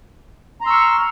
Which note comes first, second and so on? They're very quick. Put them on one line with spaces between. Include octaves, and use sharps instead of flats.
A#5 C6 E6 C#6 F6